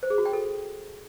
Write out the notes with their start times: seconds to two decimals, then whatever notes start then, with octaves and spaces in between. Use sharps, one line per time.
0.03 C5
0.10 G#4
0.18 F#4
0.26 G5
0.33 A4